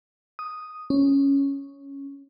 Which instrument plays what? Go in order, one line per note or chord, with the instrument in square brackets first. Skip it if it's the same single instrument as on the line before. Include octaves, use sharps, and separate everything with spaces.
[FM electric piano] D#6
C#4